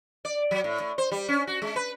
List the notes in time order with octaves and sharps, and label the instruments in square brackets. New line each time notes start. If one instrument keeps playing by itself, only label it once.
[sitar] D5
F#3
A2
A2
C5
G3
C#4
F#4
G#3
B4